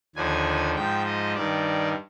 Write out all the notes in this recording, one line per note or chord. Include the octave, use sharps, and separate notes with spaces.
D#2 D3 F3 G#5
G#2 F3 G5
D#5
G2 D#3 D5